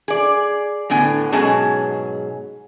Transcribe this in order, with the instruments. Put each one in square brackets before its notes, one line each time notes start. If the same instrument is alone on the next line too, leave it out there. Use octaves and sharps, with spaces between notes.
[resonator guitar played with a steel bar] G#4 D5
A2 D3 B3 G#5
G#2 B2 F#3 C#4 G#4 A5